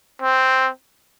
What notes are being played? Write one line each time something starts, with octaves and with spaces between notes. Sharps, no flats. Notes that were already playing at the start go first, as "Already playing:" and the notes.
C4